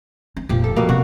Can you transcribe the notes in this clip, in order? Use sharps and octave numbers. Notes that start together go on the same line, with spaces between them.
C4
F1 A#2 F3 G4
A4
B2 F3 G3 A#3
C3 F#4